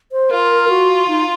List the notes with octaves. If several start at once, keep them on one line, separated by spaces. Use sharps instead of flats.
C5
F4 A#4
F#4
D#4